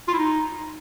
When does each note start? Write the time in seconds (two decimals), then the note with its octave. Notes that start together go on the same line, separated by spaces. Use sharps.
0.08 F4
0.13 E4
0.18 D#4